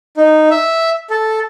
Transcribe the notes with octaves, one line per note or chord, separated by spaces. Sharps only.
D#4
E5
A4